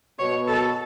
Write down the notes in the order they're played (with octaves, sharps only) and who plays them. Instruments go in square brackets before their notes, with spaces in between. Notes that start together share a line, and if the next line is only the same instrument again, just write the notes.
[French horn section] B2 [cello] C#5
[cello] A4